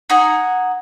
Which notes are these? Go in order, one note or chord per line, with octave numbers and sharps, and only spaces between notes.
D#4 F#5 G#5